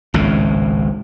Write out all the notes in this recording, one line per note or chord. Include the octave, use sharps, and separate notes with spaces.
G#1 C#2 A2